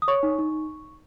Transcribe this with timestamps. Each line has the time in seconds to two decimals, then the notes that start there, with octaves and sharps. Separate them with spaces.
0.02 D#6
0.08 C#5 C#6
0.23 D#4
0.39 D#4